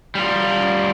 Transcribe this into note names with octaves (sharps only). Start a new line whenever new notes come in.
G3 F4